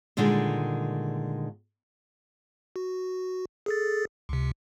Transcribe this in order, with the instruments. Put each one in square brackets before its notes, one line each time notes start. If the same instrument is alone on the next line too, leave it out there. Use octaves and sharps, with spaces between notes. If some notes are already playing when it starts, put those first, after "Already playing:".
[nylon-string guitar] A#2 D3 D#3 G3 G#3
[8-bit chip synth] F#4
G#4 A4 A6
C#2 C3